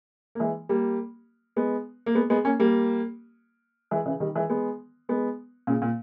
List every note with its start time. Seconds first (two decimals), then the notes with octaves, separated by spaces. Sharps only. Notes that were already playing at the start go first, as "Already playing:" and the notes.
0.35 A#3
0.39 E3 G#3
0.69 G3 A#3
1.56 G#3 B3
2.06 A#3
2.15 G#3 B3
2.30 G#3 B3
2.45 A#3 C#4
2.60 G3 A#3
3.91 E3 G#3
4.06 C#3 E3
4.20 D#3 G3
4.35 E3 G#3
4.50 G#3 B3
5.09 G#3 B3
5.67 A#2 C#3
5.82 A#2